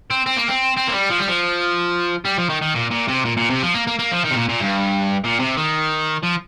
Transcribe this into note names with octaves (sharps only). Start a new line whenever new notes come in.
C4
C4
A#3
C4
C4
A#3
G3
F3
G3
F3
G3
F3
D#3
D#3
A#2
A#2
C3
A#2
A#2
C3
F3
A#3
A#3
A#3
F3
D#3
C3
A#2
A#2
G2
A#2
C3
D#3
F3